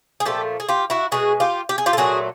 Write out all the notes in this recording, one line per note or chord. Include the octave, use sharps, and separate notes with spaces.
G#4
A#2 F3 A3 G4 A4
G#4
F4 G4
E4 F#4
B2 G#3 F#4 G#4
F4 G4
G4
G#4
F4 G4
A4
A#2 F#3 A3 F#4 G#4